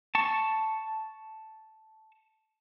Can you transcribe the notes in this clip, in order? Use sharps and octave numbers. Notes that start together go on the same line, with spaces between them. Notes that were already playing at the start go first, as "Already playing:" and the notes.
A5 C#6